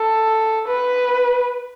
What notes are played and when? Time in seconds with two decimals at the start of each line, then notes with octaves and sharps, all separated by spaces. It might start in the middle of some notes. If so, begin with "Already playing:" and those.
Already playing: A4
0.68 B4